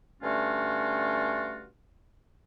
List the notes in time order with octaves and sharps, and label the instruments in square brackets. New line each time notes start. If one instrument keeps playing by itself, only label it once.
[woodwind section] G2 D3 A3 C#4 F4 F#4